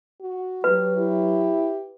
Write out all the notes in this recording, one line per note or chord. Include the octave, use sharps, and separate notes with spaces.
F#4
F#3 G4 B4
E4 G4